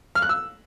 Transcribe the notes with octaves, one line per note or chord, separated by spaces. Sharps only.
F6
F#6
E6